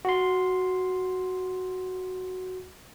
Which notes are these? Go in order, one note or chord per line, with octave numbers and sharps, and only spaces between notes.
F#4 C6